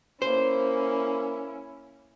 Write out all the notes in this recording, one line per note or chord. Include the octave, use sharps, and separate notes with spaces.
A#3 C#4 E4 C5